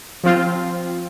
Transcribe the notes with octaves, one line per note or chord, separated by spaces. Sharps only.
F3 C4 F4